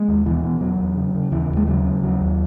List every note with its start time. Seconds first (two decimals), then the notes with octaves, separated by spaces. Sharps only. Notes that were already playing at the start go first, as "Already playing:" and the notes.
Already playing: G#3
0.08 D#2
0.26 B2 E3
0.43 B2
0.60 E2 F#3
0.79 E2
0.96 C#3
1.15 C#3
1.31 D#2 E3
1.49 D#2
1.57 G#3
1.67 C#3 F#3
1.85 C#3
2.03 D#2 F#3
2.21 D#2